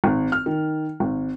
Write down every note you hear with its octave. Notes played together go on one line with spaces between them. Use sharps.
G#1
F6
D#3
G#1